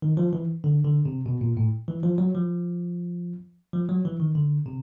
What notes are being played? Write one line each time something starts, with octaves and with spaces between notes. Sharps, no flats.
D#3
F3
E3
D3
D3
C3
B2
A#2
A2
E3
F3
F#3
F3
F3
F#3
E3
D#3
D3
C3